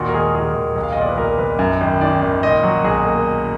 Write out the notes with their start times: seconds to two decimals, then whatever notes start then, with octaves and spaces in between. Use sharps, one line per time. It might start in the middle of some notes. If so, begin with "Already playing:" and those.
Already playing: D#2 A#2 F#4
0.09 A#4
0.14 G#3 G#4
0.35 D#2 G#4
0.55 D#2
0.76 B1
0.83 F5
0.93 D#5
0.97 A#2 D5
1.09 B4
1.17 B1 A#4
1.38 B1 B4
1.59 F#2
1.81 G#1
2.01 D#3 D5
2.22 G#1
2.43 A#2 D#5
2.63 F#3 F#4
2.84 B1 G#4
3.05 A#3